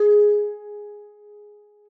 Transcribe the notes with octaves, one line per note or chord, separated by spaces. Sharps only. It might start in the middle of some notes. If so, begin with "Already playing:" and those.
Already playing: G#4